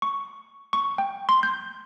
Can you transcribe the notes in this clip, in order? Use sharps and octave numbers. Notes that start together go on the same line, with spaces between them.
C#6
C#6
G5
C6
G6